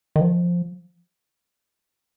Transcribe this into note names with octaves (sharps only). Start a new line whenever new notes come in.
D#3
F3